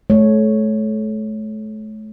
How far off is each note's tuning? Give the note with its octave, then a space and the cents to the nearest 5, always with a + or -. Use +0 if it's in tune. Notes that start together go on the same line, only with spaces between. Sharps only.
A3 -35 C#5 +0